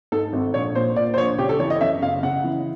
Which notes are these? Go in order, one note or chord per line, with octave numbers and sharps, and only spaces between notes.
G#2 A4
G#1
A#1 C#5
A#2 C5
A#2 D5
C5
A#1 C#5
C#3 G4
A4
E3 C#5
D#5
F#2 E5
F#1 F5
C#3 F#5
E3